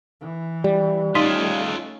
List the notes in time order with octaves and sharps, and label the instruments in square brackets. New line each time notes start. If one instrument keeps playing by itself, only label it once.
[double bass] E3
[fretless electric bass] G3
[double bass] A3 C#4 [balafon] D#4 [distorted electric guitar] F4 D#5